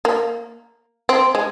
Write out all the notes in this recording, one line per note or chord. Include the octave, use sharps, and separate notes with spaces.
A#3
C4
G#3